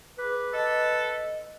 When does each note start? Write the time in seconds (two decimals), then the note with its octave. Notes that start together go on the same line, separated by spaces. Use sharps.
0.19 G#4 B4 D6
0.53 A4 D#5